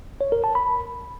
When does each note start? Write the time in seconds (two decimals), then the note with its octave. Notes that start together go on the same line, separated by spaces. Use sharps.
0.21 C#5
0.32 A#4
0.44 A5
0.55 B5